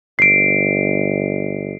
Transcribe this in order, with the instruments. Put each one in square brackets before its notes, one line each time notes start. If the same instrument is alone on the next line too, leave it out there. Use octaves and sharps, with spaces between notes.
[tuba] G1 [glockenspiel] C7 D7